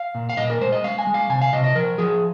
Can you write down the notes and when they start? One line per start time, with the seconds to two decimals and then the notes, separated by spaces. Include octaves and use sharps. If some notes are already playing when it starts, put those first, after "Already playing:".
Already playing: F5
0.15 A#2
0.30 F5
0.37 A#2 D#5
0.50 A#4
0.61 G#3 C5
0.72 D#5
0.84 G#3 F5
0.98 G#5
1.07 G#3
1.14 F5
1.30 C3 G#5
1.42 F5
1.53 C3 D#5
1.64 D#5
1.75 F3 A#4
1.98 F3 G#4